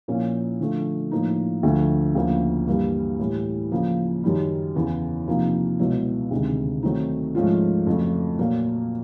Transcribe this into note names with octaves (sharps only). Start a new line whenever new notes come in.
A#2 F3 A#3 C#4 E4
D3 F3 A3
A2 F3 A#3 D#4
D2 D3 F3 A3
D2 C#3 F3 A#3
G2 E3 G3 A#3
A2 E3 G3
C#3 F3 A#3
F#2 D#3 G3
E2 C#3 E3
C3 F3 A#3 D#4
C#2 B2 F#3 B3 E4
D2 C3 D#3 G#3
D#3 F#3 A3 C4 D#4
G#2 F3 A3 C#4 F4
F2 C#3 F#3 A3
A#2 F#3 A#3